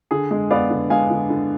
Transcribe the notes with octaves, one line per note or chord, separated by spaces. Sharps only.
D3 G#4
G#3
B3 D5 F5
D3
G#3 F5 G#5
D3
D3